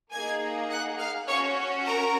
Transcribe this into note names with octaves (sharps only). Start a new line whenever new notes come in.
A#3 D#4 G#4 G#5 G#6
F#5 F#6
F5 F6
C#4 F#4 C#5 C#6
A#4 A#5